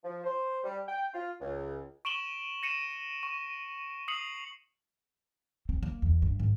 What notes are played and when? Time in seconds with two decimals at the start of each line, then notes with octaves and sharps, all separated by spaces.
0.04 F3
0.24 C5
0.64 G3
0.88 G5
1.14 F4
1.41 C#2
2.05 C#6 D7 E7 F#7 G7
2.63 A#6 C#7 D#7 E7
3.23 C#6
4.08 D#6 C7 C#7 F#7
5.69 C4
5.83 A#3
6.02 E2
6.22 G2
6.40 G#1